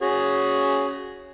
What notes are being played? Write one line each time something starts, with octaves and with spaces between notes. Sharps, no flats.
C#4 F#4 G#4